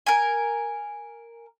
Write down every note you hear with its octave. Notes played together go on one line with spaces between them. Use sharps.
A#4 G#5